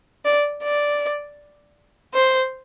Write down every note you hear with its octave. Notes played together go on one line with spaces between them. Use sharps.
D5
D5
C5